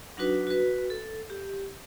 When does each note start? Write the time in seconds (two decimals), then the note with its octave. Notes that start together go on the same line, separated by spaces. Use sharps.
0.17 F#3 D4 D#4 F#4 B4
0.47 F#4 B4
0.90 A4
1.30 G4